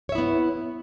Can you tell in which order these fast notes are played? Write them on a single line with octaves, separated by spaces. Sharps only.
C#5 E5 E4 B3